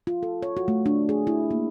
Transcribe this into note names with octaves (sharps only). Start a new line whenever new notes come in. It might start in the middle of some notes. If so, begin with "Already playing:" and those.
F4
A4
C#5
F#4
A3
D4
G#4
E4
A#3